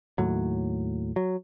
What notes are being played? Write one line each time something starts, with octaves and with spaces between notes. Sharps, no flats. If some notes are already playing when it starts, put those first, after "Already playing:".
D#2 A2 F#3
F#3